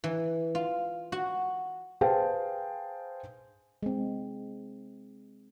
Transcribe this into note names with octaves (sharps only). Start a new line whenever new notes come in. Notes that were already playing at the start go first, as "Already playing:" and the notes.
E3
F4
F#4
G#4 B4 C5 F5 G5 A5
G#3 C4